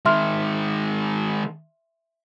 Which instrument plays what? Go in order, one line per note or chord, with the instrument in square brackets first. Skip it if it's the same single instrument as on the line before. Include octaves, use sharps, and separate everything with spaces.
[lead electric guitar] D#3 G#3 [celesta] E5 C6 F6